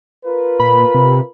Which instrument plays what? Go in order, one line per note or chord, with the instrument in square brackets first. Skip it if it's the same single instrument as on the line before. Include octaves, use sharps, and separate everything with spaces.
[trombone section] F4 A#4 B4
[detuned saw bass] A#2 [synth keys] B5
[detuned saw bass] C3